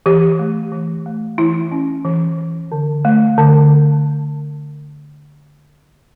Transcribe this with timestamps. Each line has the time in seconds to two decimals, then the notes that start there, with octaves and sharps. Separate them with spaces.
0.06 E3 G4
0.39 A3
0.72 E3
1.06 A3
1.38 E3 E4
1.71 C#4
2.05 E3
2.38 E3
2.72 D3
3.05 A3
3.38 D3